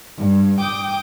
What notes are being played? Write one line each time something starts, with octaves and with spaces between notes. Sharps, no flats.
G2
G5 D6 D#6